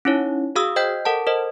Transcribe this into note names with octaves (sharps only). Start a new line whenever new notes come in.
C#4 D#4 E4 C#5
F#4 G#4 F5 D#6 E6
C5 D#5 G5 G6 B6
A4 A#4 F#5 A5
A#4 C5 D#5